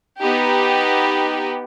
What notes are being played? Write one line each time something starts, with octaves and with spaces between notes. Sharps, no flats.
B3 D#4 G4